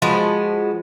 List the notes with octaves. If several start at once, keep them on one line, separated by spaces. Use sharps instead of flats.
F3 G#3 B3 F#4